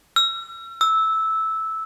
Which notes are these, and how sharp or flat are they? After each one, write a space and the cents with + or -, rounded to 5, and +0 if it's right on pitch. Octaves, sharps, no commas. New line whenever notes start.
E6 +40
E6 -10